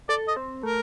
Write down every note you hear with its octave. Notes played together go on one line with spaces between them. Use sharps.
A4 D5
D#5
C4
A3 A#4